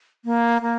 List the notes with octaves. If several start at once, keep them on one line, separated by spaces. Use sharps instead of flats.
A#3
A#3